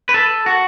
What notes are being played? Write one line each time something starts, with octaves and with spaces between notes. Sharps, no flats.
B4
A4
F#4